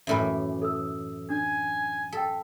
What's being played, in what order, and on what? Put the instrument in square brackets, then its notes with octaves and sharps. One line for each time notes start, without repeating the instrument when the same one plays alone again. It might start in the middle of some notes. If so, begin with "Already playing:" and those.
[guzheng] F#2 A2 E3 [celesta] E5 B5
[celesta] A4 D#6 E6
[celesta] D4 [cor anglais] G#5
[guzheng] A4 [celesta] G5 B6